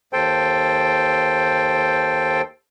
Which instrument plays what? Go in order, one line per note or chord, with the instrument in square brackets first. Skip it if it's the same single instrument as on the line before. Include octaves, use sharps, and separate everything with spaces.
[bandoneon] D#2 A4 C5 G5